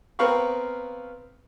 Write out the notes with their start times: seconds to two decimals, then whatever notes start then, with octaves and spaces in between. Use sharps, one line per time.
0.19 B3 C4 A#4 F5 B5 C#6